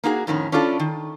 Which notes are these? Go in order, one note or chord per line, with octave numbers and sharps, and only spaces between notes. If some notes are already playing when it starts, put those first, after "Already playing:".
A#3 D#4 F#4 G#4
F2 A2 D#3 C#4
C#4 D4 E4 F4 A4
D#3